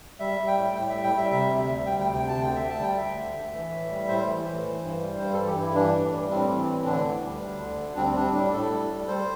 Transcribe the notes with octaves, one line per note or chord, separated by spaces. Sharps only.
G3 E5
G3
G5
A2
A2 G5
E5
G3
G5
G3 E5
C3 E5
D2
E5
G3
D2 G5
G5
C3
G5
D2 A5
D3 G5
D2 E5
A5
G3 G5
D2 E5
D3
D2
E3
A2
G3
A2 C5
E3
A2
E3
G2
G3
G2 C5
E3 A4
G4
G2 E4
E3 D4
A2
G3
A2 C4
E3
A2
D3 D4
D2
G3
D2
D3
D2
G3 C4
G3 D4
A2 D4
A2 A4
G3
G3
G3 C5